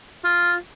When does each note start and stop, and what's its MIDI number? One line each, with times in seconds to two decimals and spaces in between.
0.24 0.54 65